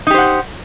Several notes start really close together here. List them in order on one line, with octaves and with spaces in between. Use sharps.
D#4 G4 C5 F#5